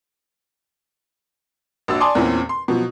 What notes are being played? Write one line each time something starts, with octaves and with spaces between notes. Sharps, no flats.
A#1 D4 F#4 D5 E6
D5 G#5 A5 C6 D6 D#6
E2 A#2 C4 C#4 E4
C6
B2 F3 F#3